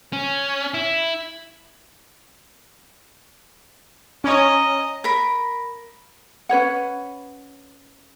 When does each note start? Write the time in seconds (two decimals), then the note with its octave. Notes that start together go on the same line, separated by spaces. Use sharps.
0.13 C#4
0.74 E4
4.24 C#4 C#5 D#5 A#5
5.04 A#4 B5
6.49 C#4 B4 C#5 F#5